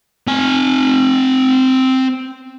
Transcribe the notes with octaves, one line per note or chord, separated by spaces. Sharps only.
C4 G#5